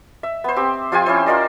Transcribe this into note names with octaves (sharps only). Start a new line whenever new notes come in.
E5
B3 C5
C4 G4
F3 F4 G4 G#5
C#4 E4 C5
F4 A#4 D5 D#5